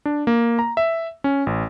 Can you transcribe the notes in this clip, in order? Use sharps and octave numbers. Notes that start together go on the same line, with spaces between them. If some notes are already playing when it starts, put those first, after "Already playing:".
D4
A#3
A#5
E5
C#4
A1